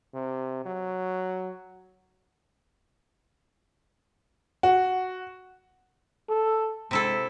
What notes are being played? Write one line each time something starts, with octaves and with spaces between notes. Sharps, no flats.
C3
F#3
F#4
A4
C3 G#3 E4 A4